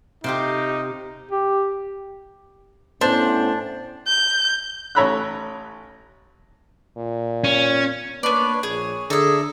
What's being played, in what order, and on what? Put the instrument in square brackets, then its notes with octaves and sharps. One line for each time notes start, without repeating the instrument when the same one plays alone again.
[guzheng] C3 F4 G4 [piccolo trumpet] D#4
[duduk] G4
[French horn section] A2 B3 C#4 [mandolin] D4 [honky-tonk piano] C5
[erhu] G6
[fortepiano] A1 C#5 A#5 B5 E6 F#6
[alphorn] A#2
[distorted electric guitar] C#4
[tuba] A#3 [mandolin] B3 D5 [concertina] D4 B4 C#5
[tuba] A#1 [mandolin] G#4 [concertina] C#5
[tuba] D3 [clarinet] G#4 [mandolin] A4 E6 [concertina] D5 E5 A#5